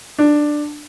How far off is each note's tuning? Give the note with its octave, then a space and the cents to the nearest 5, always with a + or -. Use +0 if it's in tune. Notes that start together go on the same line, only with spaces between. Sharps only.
D4 +10